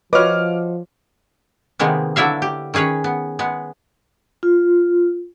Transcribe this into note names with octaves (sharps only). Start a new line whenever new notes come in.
F3 F4 F#4 B4 C#5 D#5 D6 F6
C3 D#3 G#3 A#3 B3
D3 F#3 D4 E4 E5 F5
G4
D#3 C#4 G#4 B4 C#5
B3
G#3 B3
F4